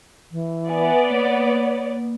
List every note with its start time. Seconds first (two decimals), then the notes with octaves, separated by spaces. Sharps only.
0.32 E3
0.69 B3 B4 D5 E5 G#5
1.10 A#3 C#5